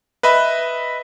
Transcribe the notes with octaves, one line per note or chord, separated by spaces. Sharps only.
B4 D#5 E5 B5